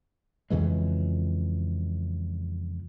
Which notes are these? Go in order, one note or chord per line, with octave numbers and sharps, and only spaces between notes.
F2 C#3 E3 G#3